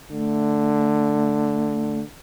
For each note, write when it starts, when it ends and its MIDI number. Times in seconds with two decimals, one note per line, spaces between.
0.11 2.05 50
0.11 2.00 57